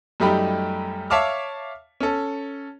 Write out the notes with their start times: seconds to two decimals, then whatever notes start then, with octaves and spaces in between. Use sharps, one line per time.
0.20 F#2 G3 A3 D#4 G4 B5
1.10 C#5 E5 F5 A5 D6 F6
2.00 C#4 A4